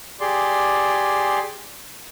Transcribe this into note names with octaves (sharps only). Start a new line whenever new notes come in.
G4 G#4 D5 C6